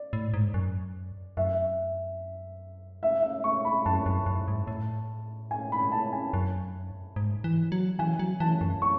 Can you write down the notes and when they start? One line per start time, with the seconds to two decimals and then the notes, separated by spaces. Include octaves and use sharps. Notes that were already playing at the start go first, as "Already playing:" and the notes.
Already playing: D5
0.13 A2
0.34 G#2
0.54 F#2
1.37 F#2 E5
3.03 E5
3.23 E5
3.44 C#6
3.65 B5
3.86 F#2 A5
4.06 F#2
4.26 F#2
4.48 G#2
4.67 A2
5.51 G#5
5.72 B5
5.92 A5
6.12 G#5
6.34 F#2
7.16 G#2
7.44 E3
7.72 F#3
7.99 E3 G#5
8.19 F#3
8.40 E3 A5
8.61 F#2
8.82 C#6